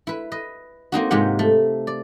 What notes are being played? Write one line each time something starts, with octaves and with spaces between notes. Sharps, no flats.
E4 B4
B4 D#5
A#3 C4 D#4 F#4
G#2 C3 G#3 F4 G4 F#5
A3
D5